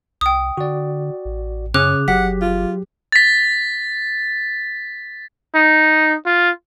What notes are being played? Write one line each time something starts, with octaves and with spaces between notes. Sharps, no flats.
C2 G5 D#6
D3 F#4 D5
A1
F#2 C#3 C#4 G#4 D6 F#6
F#1 F#3 G4 F#5 B6
F4
A6 B6
D#4
F4